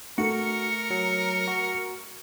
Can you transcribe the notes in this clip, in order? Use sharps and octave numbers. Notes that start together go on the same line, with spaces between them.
A3 F#4 A#4 C#7
F#3 C#7
F#4